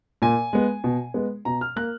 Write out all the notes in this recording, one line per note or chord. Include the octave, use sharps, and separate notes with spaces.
A#2 G#5
G#3 B3
B2
G#3 B3
B2 A#5
F6
A#3 F#6